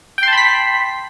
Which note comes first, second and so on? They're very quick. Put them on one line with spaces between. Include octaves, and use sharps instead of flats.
G5 C6 A5 B5 B6